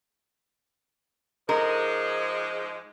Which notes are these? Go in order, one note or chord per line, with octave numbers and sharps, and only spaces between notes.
G#2 F3 G#3 A#4